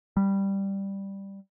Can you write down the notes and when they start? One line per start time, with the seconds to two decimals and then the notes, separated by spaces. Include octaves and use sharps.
0.17 G3